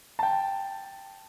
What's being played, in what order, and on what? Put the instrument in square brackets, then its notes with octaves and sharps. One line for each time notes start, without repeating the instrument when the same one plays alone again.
[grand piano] G5 A5